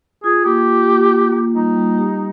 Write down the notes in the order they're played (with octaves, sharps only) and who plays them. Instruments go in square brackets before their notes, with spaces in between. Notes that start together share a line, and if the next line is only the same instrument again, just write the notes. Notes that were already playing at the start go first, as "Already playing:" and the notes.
[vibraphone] F4 [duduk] G#4
[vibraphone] A#3 [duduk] G4
[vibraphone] F4
A#3
A#3
A#3
[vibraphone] G3 [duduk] D#4
[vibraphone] G3
G4